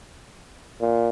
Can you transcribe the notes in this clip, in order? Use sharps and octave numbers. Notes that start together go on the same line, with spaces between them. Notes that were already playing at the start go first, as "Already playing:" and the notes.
A#2